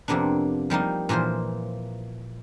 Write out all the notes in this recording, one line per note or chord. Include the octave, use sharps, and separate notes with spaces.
F2 C3 A#3 B3 D4
F3 G3 A#3 D#4
A#2 E3 F3 A#3 C5